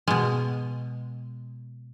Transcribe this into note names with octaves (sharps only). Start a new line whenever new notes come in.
B2 G#3